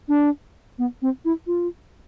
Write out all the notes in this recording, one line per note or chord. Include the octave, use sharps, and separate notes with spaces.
D4
B3
C4
E4
F4